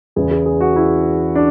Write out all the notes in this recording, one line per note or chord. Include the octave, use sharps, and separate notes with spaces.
E2 C#3 E3 G#4
G#4
G#4
F#4
E4
D4